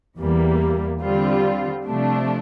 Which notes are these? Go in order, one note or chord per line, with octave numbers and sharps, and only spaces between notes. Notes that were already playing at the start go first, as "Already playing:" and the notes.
E2 E3 G3 A#3
D3 G3 C4 F4
C3 F3 A3 D4